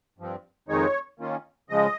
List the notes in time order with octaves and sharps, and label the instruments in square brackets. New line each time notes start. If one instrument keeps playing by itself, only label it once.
[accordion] G2 F3 C4
F2 D#3 G#3 D#4 C#5
D#3 A#3 C#4 F4
C#3 F3 G#3 D#5